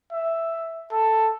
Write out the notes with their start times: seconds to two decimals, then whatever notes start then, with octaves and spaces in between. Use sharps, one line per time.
0.12 E5
0.92 A4